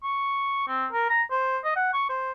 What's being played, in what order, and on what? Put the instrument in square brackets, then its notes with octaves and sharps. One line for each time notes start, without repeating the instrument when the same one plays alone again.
[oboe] C#6
C4
A#4
A#5
C5
D#5
F#5
C#6
C5